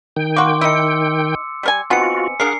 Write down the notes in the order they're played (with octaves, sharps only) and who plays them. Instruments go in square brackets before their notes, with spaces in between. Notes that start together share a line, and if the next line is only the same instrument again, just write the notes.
[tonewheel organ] D#3 G5
[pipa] A#3 F#4 [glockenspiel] C6 D6
[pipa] D#4 E4 [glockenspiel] E6 C#7
[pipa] G3 A#4 G#5
[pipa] B3 C4 D#4 [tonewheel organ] F4 F#4 [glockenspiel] G#5 C#7
[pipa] D4 A#4 [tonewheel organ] G#4 F5 F#5 [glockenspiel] C7